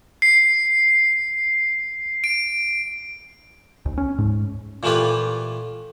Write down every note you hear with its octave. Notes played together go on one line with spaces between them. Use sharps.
C7
D7
D2
C#4
G#2
A#2 E3 A3 F4 G4 B4